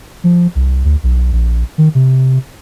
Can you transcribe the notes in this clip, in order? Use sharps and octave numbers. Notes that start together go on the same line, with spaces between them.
F3
C2
D2
B1
A#1
D#3
C3